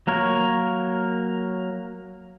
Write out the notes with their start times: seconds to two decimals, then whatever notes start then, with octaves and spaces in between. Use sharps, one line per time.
0.07 F#3 A#3 A#4 C#5